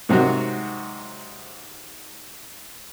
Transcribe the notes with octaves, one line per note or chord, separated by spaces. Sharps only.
G#2 C3 F#3 F#4